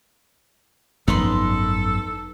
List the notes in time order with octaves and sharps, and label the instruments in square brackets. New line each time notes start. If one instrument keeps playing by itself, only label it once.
[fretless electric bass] G#1 F3 [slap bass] F#2 B3 [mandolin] D#4 B4 C6 [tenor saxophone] A4